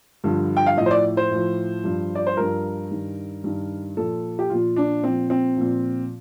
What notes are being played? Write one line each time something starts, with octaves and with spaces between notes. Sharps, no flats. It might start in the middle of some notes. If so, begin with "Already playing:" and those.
G2 D3 F3
G5
F5
A2 F3 D#5
C5
D5
C5
A2
F3
G2 F3
D5
C5
G2 F3 A#4
G2 D#3
G2 D#3
A#2 F3 A4
G4
A#2 F3 F4
D4
A#2 F3 C4
C4
A#2 F3